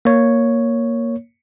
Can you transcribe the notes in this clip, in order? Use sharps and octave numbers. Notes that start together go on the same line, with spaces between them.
A#3 C#5